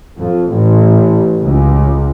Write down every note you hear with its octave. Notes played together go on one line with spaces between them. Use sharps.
F2
A1
C#2